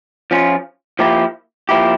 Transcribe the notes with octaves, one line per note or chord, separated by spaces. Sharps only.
F3 C#4 F4
F3 A#3 E4 G4
F3 A#3 E4 G4